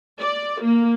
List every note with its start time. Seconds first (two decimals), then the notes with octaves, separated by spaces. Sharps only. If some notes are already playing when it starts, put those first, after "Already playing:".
0.20 D5
0.63 A#3